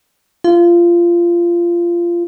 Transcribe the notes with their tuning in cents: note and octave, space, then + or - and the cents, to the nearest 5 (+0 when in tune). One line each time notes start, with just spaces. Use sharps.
F4 -20